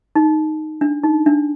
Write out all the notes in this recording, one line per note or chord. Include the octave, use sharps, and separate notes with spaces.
D#4
D4
D#4
D4